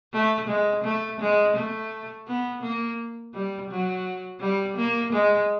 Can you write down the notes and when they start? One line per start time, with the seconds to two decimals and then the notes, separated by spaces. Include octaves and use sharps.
0.14 A3
0.48 G#3
0.84 A3
1.20 G#3
1.56 A3
2.27 B3
2.63 A#3
3.34 G3
3.70 F#3
4.41 G3
4.77 A#3
5.13 G#3